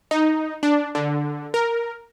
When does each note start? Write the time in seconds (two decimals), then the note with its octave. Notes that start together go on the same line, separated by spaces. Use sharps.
0.11 D#4
0.63 D4
0.95 D3
1.54 A#4